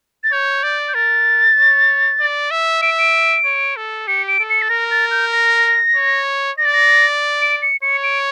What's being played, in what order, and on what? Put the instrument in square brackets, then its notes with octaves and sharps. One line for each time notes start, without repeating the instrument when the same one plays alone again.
[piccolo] A6
[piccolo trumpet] C#5 [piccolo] G6
[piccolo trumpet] D5
[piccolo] G6
[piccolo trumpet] A#4 [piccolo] A6
[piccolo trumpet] C#5
D5
E5
[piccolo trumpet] E5 [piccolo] D7
[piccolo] D7
[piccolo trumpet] C#5
A4
[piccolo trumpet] G4 [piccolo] C#7
[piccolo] D7
[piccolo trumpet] A4
[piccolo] C#7
A6
[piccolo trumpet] A#4 [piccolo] A#6
[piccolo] A6
G6
A#6
[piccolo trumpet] C#5
[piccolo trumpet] D5 [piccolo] A#6
[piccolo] A6
A#6
D7
C#7
[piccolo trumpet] C#5 [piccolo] C#7
[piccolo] D7